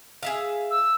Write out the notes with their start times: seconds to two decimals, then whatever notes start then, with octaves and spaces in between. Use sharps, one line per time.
0.23 G#4 E5 F5
0.71 E6